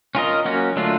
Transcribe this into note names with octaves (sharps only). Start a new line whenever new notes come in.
C#4 F4 A#4 D#5
F#3 A#3 C#4 F#4
D3 F#3 A3 D4 F4